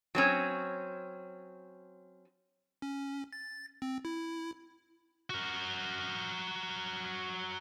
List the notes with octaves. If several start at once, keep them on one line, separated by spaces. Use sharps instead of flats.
F#3 C4 C#4
C#4
A6
C4
E4
F#4 A#4